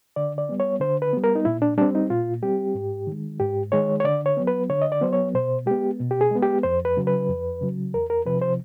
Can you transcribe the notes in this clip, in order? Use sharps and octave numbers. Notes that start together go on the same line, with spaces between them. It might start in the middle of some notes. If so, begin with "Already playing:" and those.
D3 D5
D5
G3 B3
C#5
D3 C5
B4
G3 B3
A#4
D#4
A#2 E4
D4
G3 C4 D4
D#4
A#2 F4
G3 C4 G4
G#2
D#3 G#3
G#2 G4
D#3 G#3 C#5
C#5
D3 D5
C#5
F#3 B3
B4
D3 C#5
D#5
D5
F#3 B3 C5
C#5
B2 C5
G#3 B3 G4
B2
G4
G#4
G#3 B3
G4
F2 C5
B4
C#3 F#3
B4
F2
C#3 F#3
E2 A#4
A#4
C3 F3 B4
C5